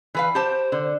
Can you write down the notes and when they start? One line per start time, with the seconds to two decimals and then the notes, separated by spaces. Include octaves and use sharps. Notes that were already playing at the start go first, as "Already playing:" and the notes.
0.15 E3 B4 F5
0.35 G4 C5 A5
0.72 D3